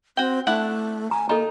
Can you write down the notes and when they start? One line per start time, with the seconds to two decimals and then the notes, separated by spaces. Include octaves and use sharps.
0.17 C4 F#4 G5
0.47 A3 D4 E4 F#5
1.11 G#5 A#5
1.29 A#3 D#4 A4 D#5 A#5